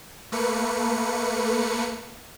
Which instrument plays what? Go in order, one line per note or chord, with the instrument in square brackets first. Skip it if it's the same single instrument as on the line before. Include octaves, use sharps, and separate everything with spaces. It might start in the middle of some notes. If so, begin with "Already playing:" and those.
[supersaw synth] A3 A#3 B4 C#7